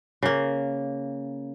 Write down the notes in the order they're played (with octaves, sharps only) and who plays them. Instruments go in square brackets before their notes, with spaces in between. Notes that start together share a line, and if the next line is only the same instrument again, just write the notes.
[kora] C#3 A#3